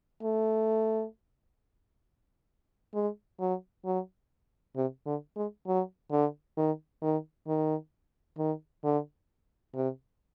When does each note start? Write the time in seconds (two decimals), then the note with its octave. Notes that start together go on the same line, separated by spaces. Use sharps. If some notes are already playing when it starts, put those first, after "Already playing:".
0.23 A3
2.94 G#3
3.40 F#3
3.85 F#3
4.76 C3
5.06 D3
5.36 G#3
5.67 F#3
6.11 D3
6.57 D#3
7.02 D#3
7.48 D#3
8.38 D#3
8.84 D3
9.74 C3